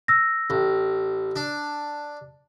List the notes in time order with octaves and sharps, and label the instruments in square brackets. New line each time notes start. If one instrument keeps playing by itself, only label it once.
[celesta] E6 A#6
[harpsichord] A1
D4